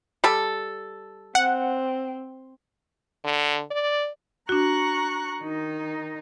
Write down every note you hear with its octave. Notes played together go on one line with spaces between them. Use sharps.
G3 A4
C4 F#5
D3
D5
D4 F#4 A#5 C#6 F#6
D#3 D#4